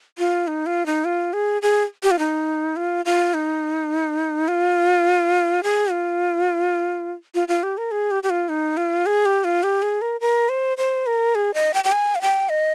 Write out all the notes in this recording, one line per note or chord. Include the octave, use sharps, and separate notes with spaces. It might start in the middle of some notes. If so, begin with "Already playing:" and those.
F4
D#4
F4
D#4
F4
G#4
G#4
G4
F4
D#4
F4
F4
D#4
F4
G#4
F4
F4
F4
G4
A#4
G#4
G4
G4
F4
D#4
F4
G#4
G4
F4
G4
G#4
A#4
A#4
C5
C5
A#4
G#4
D#5
G5
G5
G#5
F5
G5
D#5